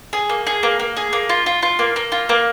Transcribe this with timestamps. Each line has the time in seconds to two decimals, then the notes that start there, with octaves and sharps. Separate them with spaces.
0.13 G#4
0.30 A#3
0.47 G#4
0.63 A#3
0.80 A#3
0.97 G#4
1.13 A#3
1.29 F4
1.46 F4
1.63 F4
1.79 A#3
1.96 A#3
2.12 F4
2.29 A#3